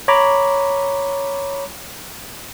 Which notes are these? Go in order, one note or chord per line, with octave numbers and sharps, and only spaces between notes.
C#5 A#5 B5 D6